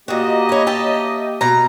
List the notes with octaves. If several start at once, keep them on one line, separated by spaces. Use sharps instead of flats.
A#2 A#3 F#4 G4 D#5
E4 C#5
E5 G5 A5
B2 A#5